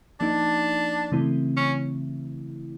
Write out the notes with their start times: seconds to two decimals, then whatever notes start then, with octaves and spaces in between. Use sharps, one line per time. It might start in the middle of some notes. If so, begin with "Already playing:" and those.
0.20 F3 A#3 D4 D#4
1.12 C#3 E3 A3 C4 E4
1.57 C#4